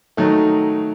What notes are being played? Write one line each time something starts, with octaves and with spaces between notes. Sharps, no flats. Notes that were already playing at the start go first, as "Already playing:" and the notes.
D#3 F#3 A3 D#4